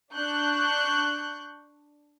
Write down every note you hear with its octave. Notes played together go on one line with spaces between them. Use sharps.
D4 C#6 F#6 G6